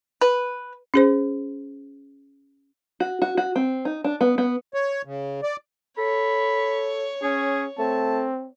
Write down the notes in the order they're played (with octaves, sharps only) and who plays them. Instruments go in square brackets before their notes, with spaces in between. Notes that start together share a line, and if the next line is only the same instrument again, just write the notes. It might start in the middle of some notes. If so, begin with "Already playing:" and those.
[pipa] B4
[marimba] C#4 G#4 C5
[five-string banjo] F#4
F#4
F#4
C4
D#4
D4
B3
B3
[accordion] C#5
C#3
D5
[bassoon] A4 [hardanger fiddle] C#5 [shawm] B5
[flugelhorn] C#4 [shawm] G#4
[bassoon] A3 [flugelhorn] C4 [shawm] A5